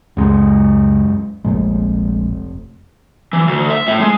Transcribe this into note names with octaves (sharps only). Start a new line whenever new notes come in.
C#2 F#2 G#3
F1 A#1 A#2 G#3
E3
D2
E5
A2
G#3